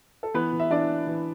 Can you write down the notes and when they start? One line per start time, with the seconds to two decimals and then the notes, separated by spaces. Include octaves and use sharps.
0.23 A4
0.34 E3 B3 B4
0.53 E3
0.59 E5
0.70 E3 D4 D5
0.89 E3
1.07 E3